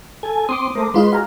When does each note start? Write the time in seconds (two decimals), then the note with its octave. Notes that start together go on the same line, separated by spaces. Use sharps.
0.23 A4 G#5
0.49 C4 C6 D6 D#6
0.75 A3 A#4 C5
0.94 G#3 F4 B4 D#5 C6
1.13 F#4 G#4 F5 A#5